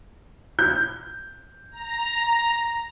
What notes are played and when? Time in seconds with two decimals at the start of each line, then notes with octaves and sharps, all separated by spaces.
0.59 G6
1.72 A#5 A#6